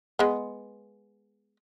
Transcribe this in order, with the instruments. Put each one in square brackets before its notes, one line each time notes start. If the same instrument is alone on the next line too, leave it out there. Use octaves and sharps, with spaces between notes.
[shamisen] G#3 B3